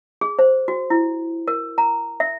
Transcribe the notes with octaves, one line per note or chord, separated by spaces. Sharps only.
G#4
C5
F#4
E4
A#4
A#5
E5